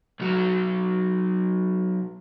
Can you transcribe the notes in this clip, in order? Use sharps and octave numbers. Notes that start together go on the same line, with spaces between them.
B1 F#3